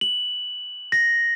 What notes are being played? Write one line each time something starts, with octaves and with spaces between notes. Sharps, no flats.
F#7
A#6